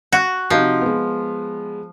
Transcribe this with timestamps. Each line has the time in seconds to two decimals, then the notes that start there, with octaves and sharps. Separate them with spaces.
0.12 F#4
0.50 C3 F3 D#4 F#4
0.81 G#3 B3